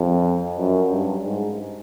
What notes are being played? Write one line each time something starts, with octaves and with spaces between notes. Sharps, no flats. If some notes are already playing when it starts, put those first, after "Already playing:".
Already playing: F2
F#2
G2
G#2